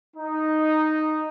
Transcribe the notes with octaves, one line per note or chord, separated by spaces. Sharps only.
D#4